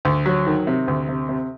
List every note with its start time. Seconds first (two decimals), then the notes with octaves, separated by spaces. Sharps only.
0.05 D2
0.26 F#3
0.47 D#3
0.67 C3
0.88 D2
1.09 C3
1.29 C3